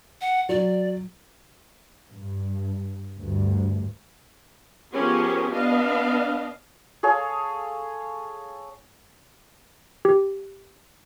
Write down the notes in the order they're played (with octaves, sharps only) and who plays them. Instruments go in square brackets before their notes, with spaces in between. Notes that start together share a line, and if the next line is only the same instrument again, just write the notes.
[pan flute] F#5
[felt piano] F#3 [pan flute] D5
[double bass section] G2
D2 G2
[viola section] F3 B3 C#4 G4 G#4 A#4
B3 D4 D#5 F5
[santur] G#4 A4 C#5 F5
[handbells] G4